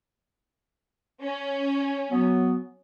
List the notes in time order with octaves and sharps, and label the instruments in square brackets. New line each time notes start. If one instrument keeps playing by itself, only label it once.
[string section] C#4
[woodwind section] F#3 B3